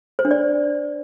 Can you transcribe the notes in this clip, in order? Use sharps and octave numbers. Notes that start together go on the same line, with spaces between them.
C5
D4
D5